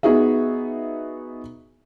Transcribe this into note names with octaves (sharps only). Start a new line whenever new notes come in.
B3 D#4 F#4 G#4 E5